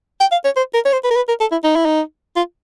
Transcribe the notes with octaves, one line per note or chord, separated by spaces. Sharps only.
G5
F5
C#5
C5
A#4
C#5
C5
B4
A#4
B4
A#4
A4
E4
D#4
E4
D#4
F4